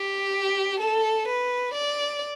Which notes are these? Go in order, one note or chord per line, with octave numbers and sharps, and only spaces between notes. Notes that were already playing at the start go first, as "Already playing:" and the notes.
Already playing: G4
A4
B4
D5